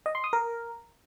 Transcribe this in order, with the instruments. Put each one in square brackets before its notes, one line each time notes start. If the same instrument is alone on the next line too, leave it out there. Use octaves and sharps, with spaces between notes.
[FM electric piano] D#5
C6
D#6
A#4